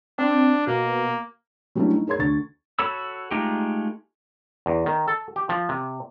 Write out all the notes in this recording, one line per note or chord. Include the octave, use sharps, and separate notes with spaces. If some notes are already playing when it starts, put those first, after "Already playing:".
C4 D4
B2 A#3
F#3 G3 A3 C#4 D4 E4
D#4
G#4 A#4 C#5 C6 G#6
D2 C#6 A6
F#4 A4 C#5 B5 E6
G#3 A3 D#4 F4 G4
E2
D#3
A4
G4
F3
C3